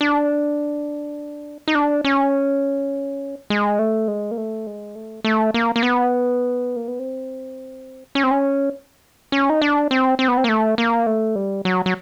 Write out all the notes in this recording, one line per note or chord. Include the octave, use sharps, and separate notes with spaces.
D4
D#4
D4
C#4
G#3
A3
G#3
A#3
A3
G#3
A3
A3
A#3
A#3
B3
A#3
B3
C4
C#4
C4
C#4
C#4
D#4
D4
C4
C4
B3
C4
A#3
A3
A#3
A3
G3
F#3
F#3